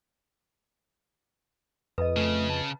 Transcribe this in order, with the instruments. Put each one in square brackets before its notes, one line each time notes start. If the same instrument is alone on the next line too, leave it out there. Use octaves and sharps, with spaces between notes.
[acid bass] F2 [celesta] B4 D#5 [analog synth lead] D#6
[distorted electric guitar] C#3 [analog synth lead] A3
[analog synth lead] A5